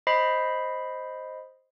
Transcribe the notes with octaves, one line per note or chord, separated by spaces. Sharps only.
C5 D#5 B5 C7